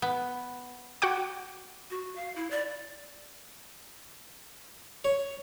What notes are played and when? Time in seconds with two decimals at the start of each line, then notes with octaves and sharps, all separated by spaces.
0.02 B3
1.02 F#4 F#5 G5 D6
1.91 F#4
2.16 F5
2.36 E4
2.51 D5
5.05 C#5